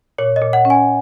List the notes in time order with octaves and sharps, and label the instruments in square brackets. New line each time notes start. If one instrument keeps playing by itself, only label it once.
[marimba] A#2 [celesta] C#5
[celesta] D#5
[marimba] A#2
[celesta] F#5
[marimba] C#4
[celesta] G#5